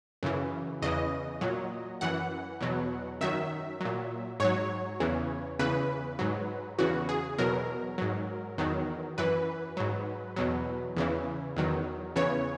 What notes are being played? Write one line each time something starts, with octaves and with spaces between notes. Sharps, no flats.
F#2 C#3 E3
E2 C#3 E3 D#5
A#2 F#3
F#2 E3 F#5
E2 B2 F#3
F#2 D#3 F#3 E5
A#2 F#3
G#2 F#3 C#5
E2 C#3 E3
E2 C#3 E3 B4
G#2 F#3
E2 C#3 E3 F#4
G#4
E2 B2 F#3 A#4
G#2 F#3
E2 D#3 F#3
F#2 E3 B4
G#2 F#3
E2 B2 F#3
E2 C#3 E3
E2 D#3 F#3
E2 C#3 E3 C#5